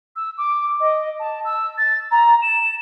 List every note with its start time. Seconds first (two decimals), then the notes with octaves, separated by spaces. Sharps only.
0.16 E6
0.38 D6
0.80 D#5
1.20 A5
1.45 E6
1.78 A6
2.11 A#5
2.42 E7